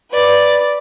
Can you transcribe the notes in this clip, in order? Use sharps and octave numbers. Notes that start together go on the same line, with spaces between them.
B4 D5